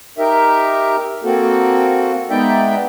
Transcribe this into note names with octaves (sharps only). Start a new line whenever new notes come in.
D#4 G4 A#4 E5
A#3 C4 F#4 A4
G#3 B3 D#4 D5 E5 G5